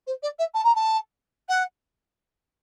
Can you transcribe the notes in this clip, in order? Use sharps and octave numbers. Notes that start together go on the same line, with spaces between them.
C5
D5
E5
A5
A#5
A5
F#5